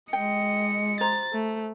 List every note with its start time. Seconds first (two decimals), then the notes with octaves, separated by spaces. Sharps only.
0.13 G#3 D#5 G5 C#7
1.01 C5 A#5 A6
1.33 A3